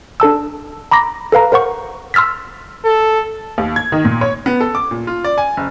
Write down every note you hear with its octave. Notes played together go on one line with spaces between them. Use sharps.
D4 A4 A5 E6
A#5 B5 D6 A#6
A4 B4 F5 A#5
A#4 C5 F#5 C#6
C6 E6 F6 A6 B6
A4
D#2
G#6
D#3
A#2
C#5
B3
A4
D6
A#2
F4
D5
G#5
F#1